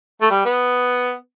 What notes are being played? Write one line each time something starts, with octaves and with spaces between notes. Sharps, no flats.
A3
G3
B3